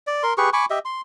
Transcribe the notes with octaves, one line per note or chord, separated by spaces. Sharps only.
D5
A#4 C6
G4 G#4 B4 C#6
G#5 B5 C#6 D6
G4 D#5 E5
C6